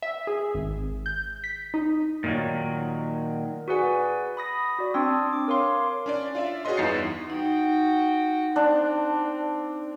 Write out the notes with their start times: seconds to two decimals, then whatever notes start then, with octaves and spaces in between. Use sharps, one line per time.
0.02 E5
0.27 G#4
0.55 G#1
1.06 G6
1.44 B6
1.74 D#4
2.24 A#2 D#3 F#3
3.68 F#4 G#4 B4 D5 F#5 G#5
4.37 B5 D#6 A#6
4.79 F#4 D5 D#6
4.94 C4 D4 C6 D#6 E6
5.32 D6
5.48 A#4 C#5 F5 C6 D6
6.06 C#4 D4 D5
6.35 F4 D5 E5
6.65 F#4 G#4 B4 C#5 D#5 C6
6.77 E2 G2 D#4 A6 C7 C#7
7.30 D#4 F#4 G5
8.56 C4 D4